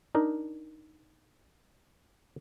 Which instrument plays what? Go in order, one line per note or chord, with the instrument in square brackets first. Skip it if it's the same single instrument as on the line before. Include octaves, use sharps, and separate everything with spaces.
[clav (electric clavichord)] D4 D#4 A#4